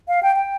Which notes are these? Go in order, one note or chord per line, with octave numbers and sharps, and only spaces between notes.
F5
G5
G5